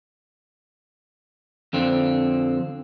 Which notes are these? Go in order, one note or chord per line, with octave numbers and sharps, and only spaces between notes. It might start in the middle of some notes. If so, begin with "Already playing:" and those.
F2 D3 C4